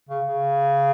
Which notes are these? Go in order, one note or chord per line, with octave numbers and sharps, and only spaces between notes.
C#3
C#3